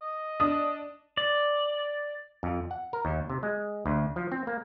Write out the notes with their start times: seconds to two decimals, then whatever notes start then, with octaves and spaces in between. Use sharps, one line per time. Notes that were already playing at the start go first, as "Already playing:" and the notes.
0.02 D#5
0.40 D4 D#6
1.17 D5
2.43 F2
2.71 F#5
2.93 A#4
3.05 D#2
3.30 C3
3.43 G#3
3.86 D2
4.16 F3
4.32 C4
4.47 A#3